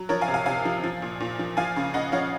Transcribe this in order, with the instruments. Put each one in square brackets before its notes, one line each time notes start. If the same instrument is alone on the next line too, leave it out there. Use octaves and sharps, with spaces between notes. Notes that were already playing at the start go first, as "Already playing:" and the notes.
Already playing: [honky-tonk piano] F#3
F3 A#4 C#5
F5 G#5
C3
F5 G#5
C3 F5 G#5
F3
F3
A#2
A#2
F3
F3 F5 G#5
C#3
C#3 D#5 F#5
F3 C#5 F5